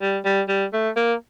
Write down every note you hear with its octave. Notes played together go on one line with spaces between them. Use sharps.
G3
G3
G3
A3
A#3